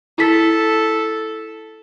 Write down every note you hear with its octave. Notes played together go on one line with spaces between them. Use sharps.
E4 A4 B6